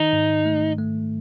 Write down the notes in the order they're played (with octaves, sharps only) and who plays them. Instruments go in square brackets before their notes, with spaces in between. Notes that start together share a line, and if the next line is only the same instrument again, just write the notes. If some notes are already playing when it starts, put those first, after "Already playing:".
Already playing: [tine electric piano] D#3 [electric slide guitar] D#4
[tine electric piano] G#2
A3
A3